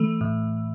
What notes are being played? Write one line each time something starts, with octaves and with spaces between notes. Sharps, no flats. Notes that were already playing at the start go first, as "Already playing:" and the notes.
Already playing: E3 A3
A2